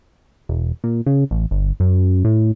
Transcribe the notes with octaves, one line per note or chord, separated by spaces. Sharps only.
E1
A#2
C#3
A1
G1
F#2
A2